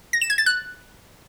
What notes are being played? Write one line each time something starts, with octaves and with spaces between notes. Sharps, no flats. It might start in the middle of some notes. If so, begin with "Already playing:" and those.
A#6
E7
G#6
A6
F#6